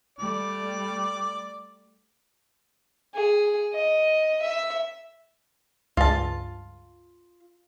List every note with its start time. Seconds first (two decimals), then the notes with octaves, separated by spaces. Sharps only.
0.19 G3 A3 D5
3.14 G#4
3.73 D#5
4.42 E5
5.97 C#2 G2 F4 A5